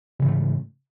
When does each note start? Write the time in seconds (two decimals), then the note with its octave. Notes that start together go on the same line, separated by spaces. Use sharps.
0.19 C#3
0.22 E3
0.25 G#2
0.27 A3